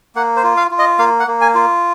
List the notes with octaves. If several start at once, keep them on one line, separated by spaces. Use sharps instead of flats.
A#3 F#5
C5
F4
F5
F4
D#5
A#3 F5
F#5
A#3
G#5
F4